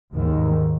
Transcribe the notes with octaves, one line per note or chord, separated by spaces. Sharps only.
D#2 G#2 D#3